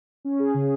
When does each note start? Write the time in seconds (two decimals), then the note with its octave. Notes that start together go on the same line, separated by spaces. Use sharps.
0.25 C#4
0.39 G#4
0.54 C#3